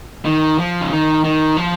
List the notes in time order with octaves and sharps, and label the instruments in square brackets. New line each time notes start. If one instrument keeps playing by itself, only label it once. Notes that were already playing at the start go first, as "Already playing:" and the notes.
[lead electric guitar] D#3
F3
C#3
D#3
D#3
F3